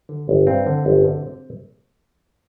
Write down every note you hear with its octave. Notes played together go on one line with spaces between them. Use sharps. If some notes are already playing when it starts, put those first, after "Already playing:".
D3
G1
G2 C4
D3
G1
D3